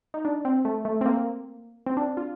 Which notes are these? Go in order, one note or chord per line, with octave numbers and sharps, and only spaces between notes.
D#4
D4
C4
A3
A3
C4
A#3
C4
D4
F4